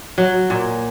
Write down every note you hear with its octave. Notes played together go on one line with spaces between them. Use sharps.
F#3
A#2